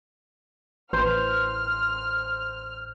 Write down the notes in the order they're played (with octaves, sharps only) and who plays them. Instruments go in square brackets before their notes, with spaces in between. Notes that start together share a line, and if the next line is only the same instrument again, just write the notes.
[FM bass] A1 [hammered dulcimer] C5 [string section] F6